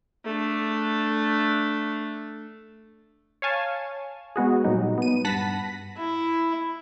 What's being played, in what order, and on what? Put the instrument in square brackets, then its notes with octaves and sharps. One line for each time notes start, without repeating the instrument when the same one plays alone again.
[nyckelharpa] A3 D4
[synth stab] C#5 F5 G#5 A5
G#3 B3 F#4 G#4
A#2 F#3 G3 D#4
B3 D#7
G2 F#5 A5 B5 A#6 B6
[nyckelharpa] E4